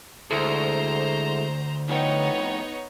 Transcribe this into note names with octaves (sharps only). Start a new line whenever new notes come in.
D2 G#3 E4 A4 C5 A#5
F2 A2 B3 D#4 C#5 G5